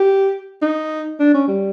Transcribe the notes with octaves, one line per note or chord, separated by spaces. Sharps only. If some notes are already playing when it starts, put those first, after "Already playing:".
Already playing: G4
D#4
D4
C#4
G3